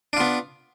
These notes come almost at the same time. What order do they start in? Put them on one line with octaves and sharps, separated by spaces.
D4 F4 B3